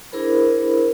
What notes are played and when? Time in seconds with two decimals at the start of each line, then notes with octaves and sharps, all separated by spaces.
0.12 D4 E4 G#4 A#4 C5 B5